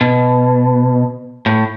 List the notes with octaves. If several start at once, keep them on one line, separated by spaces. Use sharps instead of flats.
B2
A2